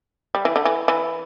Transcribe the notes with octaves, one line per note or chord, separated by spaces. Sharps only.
G3
E3
D3
E3
E3